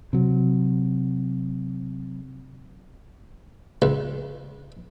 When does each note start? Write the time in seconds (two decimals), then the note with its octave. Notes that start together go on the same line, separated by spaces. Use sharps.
0.13 C3 F#3
3.82 C#2